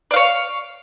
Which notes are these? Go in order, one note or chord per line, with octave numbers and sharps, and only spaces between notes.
C#5 D5 F5